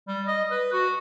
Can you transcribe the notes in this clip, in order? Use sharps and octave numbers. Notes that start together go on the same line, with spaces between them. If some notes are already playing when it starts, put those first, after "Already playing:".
G3
D#5
B4
F#4